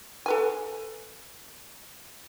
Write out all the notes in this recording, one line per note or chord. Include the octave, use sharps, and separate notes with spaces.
A4 B4 G#5